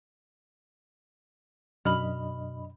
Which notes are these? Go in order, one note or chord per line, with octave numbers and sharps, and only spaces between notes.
F#2 B2 D4 D#5 B5 F6